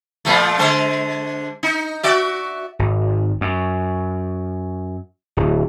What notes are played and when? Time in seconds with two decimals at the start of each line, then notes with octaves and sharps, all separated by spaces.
0.25 A#2 F3 A3
0.59 D3 G#3 C5
1.63 D#4
2.03 F#4 D5 E5
2.79 G#1
3.41 F#2
5.37 D1